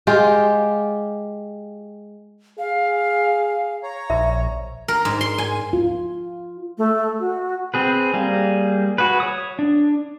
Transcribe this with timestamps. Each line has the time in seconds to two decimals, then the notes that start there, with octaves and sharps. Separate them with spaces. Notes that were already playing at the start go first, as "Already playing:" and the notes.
0.07 G#3 F4 G4
2.59 G#4 F5
3.83 C#5 A#5
4.10 A#1 E5
4.88 A#4
5.05 G#2
5.21 C6
5.38 G#5
5.73 F4
6.78 A3
7.20 F#4
7.74 C4 G#4 B4
8.14 G3 A#3 G#4
8.98 F#4 G#4 B4
9.20 C#5 D#6
9.59 D4